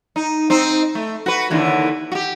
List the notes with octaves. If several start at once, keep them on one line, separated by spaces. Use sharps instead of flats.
D#4
C4 D#4
A3
F#4 B4
D#2 D3 E3
F#4 G4